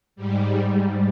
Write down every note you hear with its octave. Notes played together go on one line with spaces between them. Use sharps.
G#2 G3